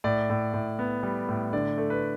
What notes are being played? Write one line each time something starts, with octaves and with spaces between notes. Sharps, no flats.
A2 D5
A2
A2
B3
G3
A2
D3 D5
A3
B4